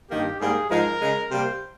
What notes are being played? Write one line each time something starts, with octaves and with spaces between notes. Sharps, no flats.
G2 D#3 A#3 G4
G#2 G3 A#3 G#4
G#2 F3 G#3 A#4
C#3 G#3
C3 G3 A#3 C5